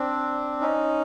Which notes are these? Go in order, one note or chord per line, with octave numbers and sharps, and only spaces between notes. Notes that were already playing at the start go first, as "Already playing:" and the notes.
Already playing: C4 D4
C#4 D#4